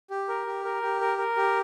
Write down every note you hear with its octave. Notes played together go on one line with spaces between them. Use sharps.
G4
A#4
G4
A#4
G4
A#4
A#4
G4